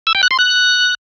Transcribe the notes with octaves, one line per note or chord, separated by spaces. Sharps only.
E6
G5
F#6
C6
F#6